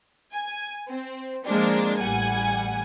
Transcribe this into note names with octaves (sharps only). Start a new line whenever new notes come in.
G#5
C4
F3 G#3 A#3 C4 D4
A1 G3 F#5 G#5